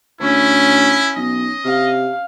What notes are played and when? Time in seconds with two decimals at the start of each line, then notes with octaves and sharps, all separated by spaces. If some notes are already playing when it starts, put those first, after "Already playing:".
0.20 D2 C#4 E4
1.16 B1 D#5
1.65 C3 F5